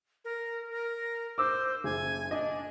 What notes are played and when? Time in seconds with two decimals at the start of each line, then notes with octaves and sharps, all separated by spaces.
0.25 A#4
0.71 A#4
1.38 C5 D6 E6
1.84 F#1 G#5
2.31 D4 D#5